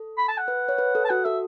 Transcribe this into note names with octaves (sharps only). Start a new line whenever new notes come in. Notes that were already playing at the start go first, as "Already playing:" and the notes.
Already playing: A4
B5
A5
F#5
B4
C#5
B4
A4
A5
F#4 F#5
A4 E5